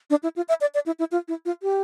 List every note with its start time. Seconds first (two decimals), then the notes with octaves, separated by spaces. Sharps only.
0.10 D4
0.23 E4
0.36 F4
0.49 E5
0.61 D5
0.74 D5
0.86 E4
0.99 E4
1.12 F4
1.28 E4
1.46 F4
1.63 G4